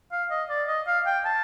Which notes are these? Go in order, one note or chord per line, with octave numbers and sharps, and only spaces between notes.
F5
D#5
D5
D#5
F5
G5
A5